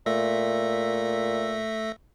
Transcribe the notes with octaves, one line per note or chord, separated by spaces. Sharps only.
A#2 A3 E5 A#6